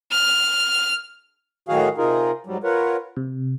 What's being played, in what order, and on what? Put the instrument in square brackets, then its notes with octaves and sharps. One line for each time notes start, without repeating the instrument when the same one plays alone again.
[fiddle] F6
[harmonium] A2 D#3 F#3 F#4 G#4 F5
C3 D#4 F4 G#4 A#4
G#2 F#3 G3
F4 A#4 B4 C#5 F#5
[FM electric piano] C3